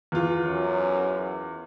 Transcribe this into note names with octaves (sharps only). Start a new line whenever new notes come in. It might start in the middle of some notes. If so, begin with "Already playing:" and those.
E2 F4
F#2